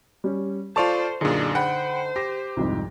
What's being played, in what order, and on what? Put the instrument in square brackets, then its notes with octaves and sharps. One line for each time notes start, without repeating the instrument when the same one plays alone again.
[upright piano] G3 C#4
[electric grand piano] F4 D5 A5 [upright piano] A4 C#6 F7 [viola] C5
[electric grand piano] F#2 A#2 [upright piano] D3 D#4 C#7 [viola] D4 G#4
[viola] C5 [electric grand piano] F#5 G5 B5
[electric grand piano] G4 [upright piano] A#6
[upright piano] C2 F2 G#2